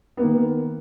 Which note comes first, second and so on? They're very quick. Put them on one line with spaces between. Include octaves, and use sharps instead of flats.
B3 A#3 D#3